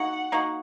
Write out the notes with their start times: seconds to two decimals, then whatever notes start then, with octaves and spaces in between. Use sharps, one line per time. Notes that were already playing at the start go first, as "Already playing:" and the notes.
Already playing: A#3 D#4 F#4 F#5
0.32 A#3 D#4 F#4